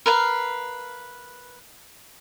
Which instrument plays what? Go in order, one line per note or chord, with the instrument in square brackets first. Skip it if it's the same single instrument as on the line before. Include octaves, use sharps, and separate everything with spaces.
[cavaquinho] A#4 B4 F5